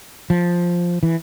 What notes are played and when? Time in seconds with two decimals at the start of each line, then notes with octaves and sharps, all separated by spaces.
0.30 F3
1.03 E3